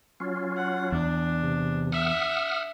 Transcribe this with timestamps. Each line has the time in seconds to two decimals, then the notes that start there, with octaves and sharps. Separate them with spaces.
0.20 F#3 C#4 F4
0.57 F#5
0.92 E2 D4
1.43 C3
1.92 E5 F#5 D#6 F6